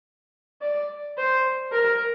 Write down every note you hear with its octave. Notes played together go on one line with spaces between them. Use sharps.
D5
C5
A#4